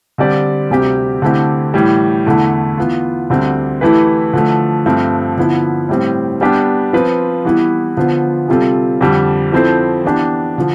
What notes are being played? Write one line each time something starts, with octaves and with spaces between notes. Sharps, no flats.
D3 G3 C4 G4 D5
D2 C3 G3 C4 G4
D3 A3 C4 E4 G4
A2 E3 G3
E2 D3 A3 E4
E3 B3 F4
D2 D3 G3 C4
E3 A3 E4 G4 B4
D3 F3 A3
G2 F3 A3 C4
D3 F3 B3 E4
A2 G3 C4
G3 B3 D4 G4
F3 C4 F4 B4
E3 G3 B3 E4
D3 F3 B3 F4 C5
C3 G3 C4 F4 A4
F2 D3 G3
F3 C4 E4 A4 C5
E3 B3 D4 G4
D3 F3